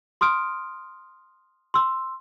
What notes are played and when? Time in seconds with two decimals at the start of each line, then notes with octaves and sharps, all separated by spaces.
0.21 C6 D#6 F6 D7
1.74 C6 E6